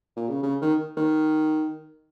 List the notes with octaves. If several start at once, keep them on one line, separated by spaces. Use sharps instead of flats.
A#2
C#3
C#3
D#3
D#3